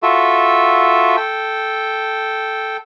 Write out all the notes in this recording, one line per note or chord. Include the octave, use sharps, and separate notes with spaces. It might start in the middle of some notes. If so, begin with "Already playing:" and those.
F4 F#4 A4 E5
A4 G5